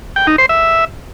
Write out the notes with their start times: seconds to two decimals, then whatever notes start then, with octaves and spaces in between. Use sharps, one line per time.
0.16 G5
0.27 D#4
0.38 C5
0.49 E5